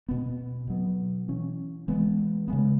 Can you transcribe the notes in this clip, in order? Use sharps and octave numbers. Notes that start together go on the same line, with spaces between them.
B2 B3
B2 F#3 B3
E3 C#4
E3 G#3 B3
C#3 G#3 B3